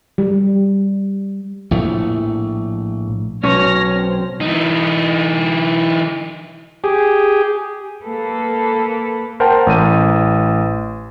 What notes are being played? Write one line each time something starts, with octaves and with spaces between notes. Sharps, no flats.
G3
A#1 A2 A3
B1 C#4 C#5 F6 A#6
C4
E3 D#4
G4 G#4
A#3 A4 B4
A#4 C5 F#5 G5 A5
A1 D#7